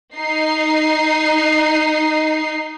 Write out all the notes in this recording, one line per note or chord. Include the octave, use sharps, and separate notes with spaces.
D#4 C7